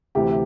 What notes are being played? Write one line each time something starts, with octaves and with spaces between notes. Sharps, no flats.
D2 C3 E3 G4